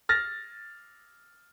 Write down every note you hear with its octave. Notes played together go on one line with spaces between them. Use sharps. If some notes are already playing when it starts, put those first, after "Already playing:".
F6 A6 A#6